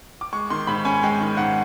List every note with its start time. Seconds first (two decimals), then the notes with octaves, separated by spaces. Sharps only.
0.21 D6
0.33 G#3 C#6
0.50 D#3 C6
0.67 G#2 B5
0.85 C#4 G#5
1.03 G#3 G5
1.21 D#3
1.37 G#2 F#5